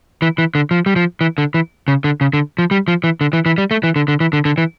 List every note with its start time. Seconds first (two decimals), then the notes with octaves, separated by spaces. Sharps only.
0.22 E3
0.38 E3
0.55 D3
0.71 F3
0.86 G3
0.96 F3
1.21 E3
1.38 D3
1.54 E3
1.88 C#3
2.04 D3
2.21 C#3
2.33 D3
2.58 F3
2.71 G3
2.88 F3
3.04 E3
3.21 D3
3.33 E3
3.46 E3
3.58 G3
3.71 A3
3.83 E3
3.96 D3
4.08 D3
4.20 E3
4.33 D3
4.45 D3
4.58 E3